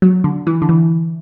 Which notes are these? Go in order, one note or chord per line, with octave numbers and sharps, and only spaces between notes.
F#3
D3
E3
D3
E3